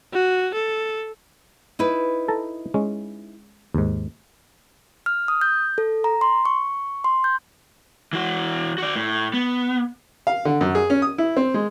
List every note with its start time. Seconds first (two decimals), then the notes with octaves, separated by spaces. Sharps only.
0.13 F#4
0.54 A4
1.79 D#4 E4 B4
2.28 A4 A5 A#5
2.74 G#3 C#4
3.74 D#2 G#2
5.06 F6
5.28 D#6
5.41 G6
5.78 A4
6.04 A#5
6.21 C6
6.45 C#6
7.04 C6
7.24 G6
8.13 E3 F#4
8.78 F#4 D5
8.96 A2
9.34 B3
10.27 F5
10.45 D3
10.61 F#2
10.75 G#4
10.90 C#4
11.02 D#6
11.18 E4
11.37 C4
11.54 G#3